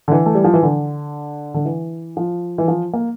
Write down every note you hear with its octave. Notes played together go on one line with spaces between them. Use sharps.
D3
E3
A3
G3
F3
E3
D3
D3
E3
F3
E3
F3
A#3